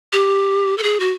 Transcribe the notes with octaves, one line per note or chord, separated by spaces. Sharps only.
G4
A4
G#4
F#4